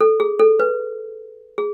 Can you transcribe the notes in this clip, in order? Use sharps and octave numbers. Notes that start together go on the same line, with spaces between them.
A4
G#4
A4
B4
G#4